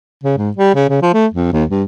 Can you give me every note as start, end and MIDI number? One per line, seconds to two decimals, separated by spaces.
0.24 0.36 49
0.37 0.51 44
0.57 0.74 55
0.75 0.85 49
0.89 1.01 49
1.02 1.11 53
1.14 1.27 57
1.34 1.52 41
1.52 1.64 39
1.70 1.84 43